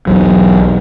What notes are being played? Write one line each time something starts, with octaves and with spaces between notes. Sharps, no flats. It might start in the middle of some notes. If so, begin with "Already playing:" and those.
B1 E2 F#3